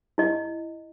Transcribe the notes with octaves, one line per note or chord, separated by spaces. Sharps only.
E4 D#5